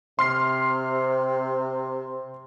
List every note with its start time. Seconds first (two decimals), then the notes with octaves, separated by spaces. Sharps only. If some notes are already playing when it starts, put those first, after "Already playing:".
0.19 C3 C6 F6 C7